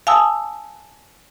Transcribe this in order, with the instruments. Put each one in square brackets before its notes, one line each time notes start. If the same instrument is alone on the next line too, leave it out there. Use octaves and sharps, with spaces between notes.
[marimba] F5 G#5 A5 D#6 E6